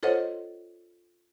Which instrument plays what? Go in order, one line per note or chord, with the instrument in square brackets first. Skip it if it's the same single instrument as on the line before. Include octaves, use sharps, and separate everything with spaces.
[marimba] F4 A4 C5 C#5 D#5 F#5